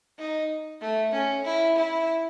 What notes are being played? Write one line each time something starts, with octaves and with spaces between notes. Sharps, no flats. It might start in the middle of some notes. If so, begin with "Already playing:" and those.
D#4
A3
C#4
E4
E4